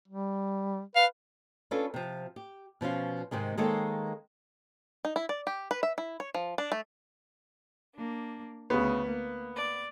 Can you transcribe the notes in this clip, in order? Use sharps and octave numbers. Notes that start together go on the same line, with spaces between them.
G3
B4 F5
C#4 D4 F4 A4 B4 C#5
C3 F3
G4
B2 F3 C#4 F4
G#2 C3 D#3 G#3
D#3 G#3 A#3 C4 A4 C#5
D#4
E4
D5
G4
B4
E5
E4
C#5
F3
D4
A3
A#3 D4
D2 C#3 B3
A#3
D5